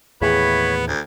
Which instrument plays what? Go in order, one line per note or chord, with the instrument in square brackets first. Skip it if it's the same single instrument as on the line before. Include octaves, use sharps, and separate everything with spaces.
[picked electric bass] D#2 A2 E3 [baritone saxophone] B3 [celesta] G#4 [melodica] C#5 B5
[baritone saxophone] D2